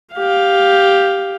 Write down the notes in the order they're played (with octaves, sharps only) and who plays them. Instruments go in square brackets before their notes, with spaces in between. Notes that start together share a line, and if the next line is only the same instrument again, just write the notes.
[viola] G4 F5